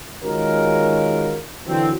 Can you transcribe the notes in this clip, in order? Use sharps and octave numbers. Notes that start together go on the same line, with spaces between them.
D#3 G#3 C#4 F4 F#4 A#4
D3 E3 F#3 C4